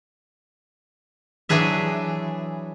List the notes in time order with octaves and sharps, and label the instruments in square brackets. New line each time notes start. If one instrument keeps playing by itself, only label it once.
[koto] E3 F#3 D4 G#4 E5